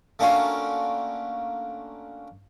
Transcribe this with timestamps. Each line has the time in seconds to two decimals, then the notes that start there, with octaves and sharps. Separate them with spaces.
0.19 A3 A#3 C#4 D4 F4 F#4